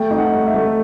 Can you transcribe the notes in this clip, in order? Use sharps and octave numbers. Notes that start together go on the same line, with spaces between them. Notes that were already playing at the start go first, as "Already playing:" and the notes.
Already playing: A3 G5
D#4
F#5
A3
E5
A3